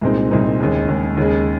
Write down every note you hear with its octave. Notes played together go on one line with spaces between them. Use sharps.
C2 A#2 G#3 C4 D#4
C2 A#2 G#3 C4 D#4
D#2 C#3 G#3
D#2 C#3 G#3
D#2 C#3 G#3